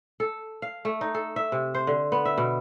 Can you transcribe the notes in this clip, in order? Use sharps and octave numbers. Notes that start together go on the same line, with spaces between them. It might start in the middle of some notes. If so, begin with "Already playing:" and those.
A4
F5
A3
D#4
A4
E5
C3
C5
D3
B3
E5
B2